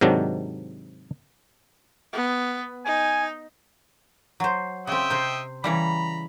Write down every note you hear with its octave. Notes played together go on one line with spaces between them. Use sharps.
G#2 C3 D#3 F#3 D4
B3
D#4 G#5
F#3 C5
C#3 C4 D#5 E5 G5
C3 C5
C#3 E3 G3 A#5 B5